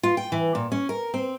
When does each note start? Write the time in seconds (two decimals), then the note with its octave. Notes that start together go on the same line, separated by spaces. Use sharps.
0.03 F4
0.17 G5
0.32 E3
0.55 A#2
0.72 C#4
0.89 A#4
1.14 C4